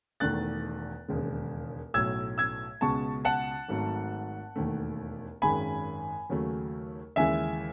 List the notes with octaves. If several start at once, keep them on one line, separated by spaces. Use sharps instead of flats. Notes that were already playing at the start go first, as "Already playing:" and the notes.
E1 E2 D#3 A3 F#6 A6
E1 D#2 C#3 G#3
B1 A2 F#3 A3 E6 G#6
E6 G#6
C#2 B2 G#3 A5 C#6
F#5 A5
G#1 G#2 F#3 A3
E1 D#2 D#3 A3
G#1 F#2 D#3 G#3 G#5 B5
D#2 C#3 F#3 A3
D#2 C#3 E3 G#3 E5 G#5